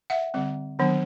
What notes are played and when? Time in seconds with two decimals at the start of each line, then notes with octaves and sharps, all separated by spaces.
0.10 E5 F#5
0.34 D3 G3 C4
0.79 D#3 F#3 B3 D4